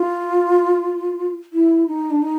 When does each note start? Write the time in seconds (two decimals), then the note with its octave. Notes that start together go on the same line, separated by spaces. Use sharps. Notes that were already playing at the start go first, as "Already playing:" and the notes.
Already playing: F4
1.53 E4
1.87 D#4
2.10 D4
2.22 D#4